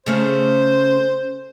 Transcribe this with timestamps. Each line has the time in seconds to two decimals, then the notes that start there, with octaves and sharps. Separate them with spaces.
0.06 C#3 A3 C#4 C5